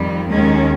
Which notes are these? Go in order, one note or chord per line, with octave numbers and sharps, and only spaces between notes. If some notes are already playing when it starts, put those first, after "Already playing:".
Already playing: F2 D#3 G3
D#2 D#3 G#3 C#4